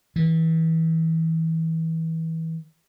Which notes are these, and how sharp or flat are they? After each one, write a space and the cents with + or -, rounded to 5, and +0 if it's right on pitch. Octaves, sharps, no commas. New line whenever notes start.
E3 -30